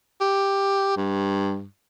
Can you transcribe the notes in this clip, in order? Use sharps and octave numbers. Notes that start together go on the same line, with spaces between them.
G4
G2